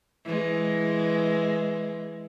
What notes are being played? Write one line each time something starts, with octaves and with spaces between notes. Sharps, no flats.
E3 G#3